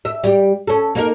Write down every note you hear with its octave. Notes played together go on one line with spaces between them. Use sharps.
E5
G3 G4
C#4 A4
A#3 D#4 A#4